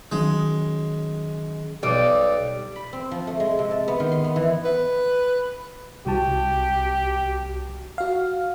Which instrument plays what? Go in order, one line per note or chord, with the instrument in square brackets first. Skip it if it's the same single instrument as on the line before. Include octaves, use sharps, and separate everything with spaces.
[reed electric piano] D#3 F#3 C#4 [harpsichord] G#3
[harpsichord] B1 [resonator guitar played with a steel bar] G3
[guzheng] B5
C4
F3
A3
G#3
C3
A5
B3
D#3
C6
B3
E3
[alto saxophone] B4
[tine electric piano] C2 F#4 A5 [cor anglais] G4
[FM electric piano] F#4 F5